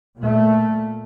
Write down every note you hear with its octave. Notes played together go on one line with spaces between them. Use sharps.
A#2 A3